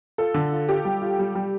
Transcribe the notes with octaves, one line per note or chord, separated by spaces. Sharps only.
F4 A4
D3
F4
F4 G4
G3
F4
G3
G3